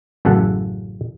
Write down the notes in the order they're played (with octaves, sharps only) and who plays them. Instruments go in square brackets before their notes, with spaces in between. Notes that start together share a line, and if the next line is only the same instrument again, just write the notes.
[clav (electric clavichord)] A1 F#2 C#3 A4 F#5